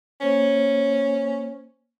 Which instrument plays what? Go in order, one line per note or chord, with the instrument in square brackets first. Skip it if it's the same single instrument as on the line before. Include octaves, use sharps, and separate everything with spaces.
[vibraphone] A#3 C5 [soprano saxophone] C#4